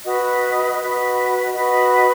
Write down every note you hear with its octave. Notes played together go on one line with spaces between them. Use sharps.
F#4 B4 D#5
F#4 B4 D#5
F#4 B4 D#5